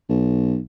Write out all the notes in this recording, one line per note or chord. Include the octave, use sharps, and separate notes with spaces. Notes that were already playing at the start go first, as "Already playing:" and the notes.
B1